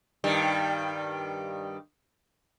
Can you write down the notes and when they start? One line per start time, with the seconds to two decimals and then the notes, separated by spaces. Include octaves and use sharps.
0.24 G2 D#3 G3